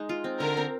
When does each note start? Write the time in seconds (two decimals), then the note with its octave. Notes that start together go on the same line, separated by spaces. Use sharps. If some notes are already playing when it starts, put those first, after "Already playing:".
Already playing: G#3 D#4
0.09 F4
0.24 C4
0.40 D3 A#4
0.57 C4